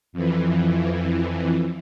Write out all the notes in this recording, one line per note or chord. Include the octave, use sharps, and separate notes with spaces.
F2 E3